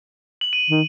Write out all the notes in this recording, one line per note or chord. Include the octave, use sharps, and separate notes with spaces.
F#7
D#7
D#3